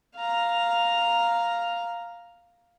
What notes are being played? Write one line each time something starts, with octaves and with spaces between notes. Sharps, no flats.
F5 A#5